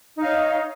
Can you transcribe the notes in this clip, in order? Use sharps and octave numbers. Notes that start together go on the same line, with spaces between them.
D#4 C#5 F5